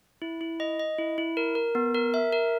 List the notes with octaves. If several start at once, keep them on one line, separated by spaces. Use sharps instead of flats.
E4
E4
D#5
D#5
E4
E4
A#4
A#4
B3
A#4
E5
A#4